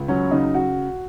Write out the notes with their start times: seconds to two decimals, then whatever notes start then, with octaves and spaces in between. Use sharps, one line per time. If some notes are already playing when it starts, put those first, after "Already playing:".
Already playing: C#2
0.08 F#3 C#4
0.31 C#3 D#4
0.55 F#4